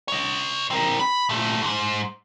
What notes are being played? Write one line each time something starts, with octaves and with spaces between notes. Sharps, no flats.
C#5 D#5
C4 A#4
B5
A#2 A3
D2 G#2